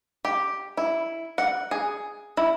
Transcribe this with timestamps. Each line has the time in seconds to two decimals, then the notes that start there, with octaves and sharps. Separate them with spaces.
0.25 G4
0.77 E4
1.38 F#5
1.71 G#4
2.37 E4